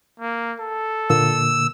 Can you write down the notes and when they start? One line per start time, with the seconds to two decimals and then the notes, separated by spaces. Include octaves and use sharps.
0.20 A#3
0.60 A4
1.10 A#2 D3 A#3 E6